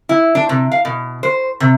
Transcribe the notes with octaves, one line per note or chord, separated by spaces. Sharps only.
E4
D4
C3
F5
B2
C5
C3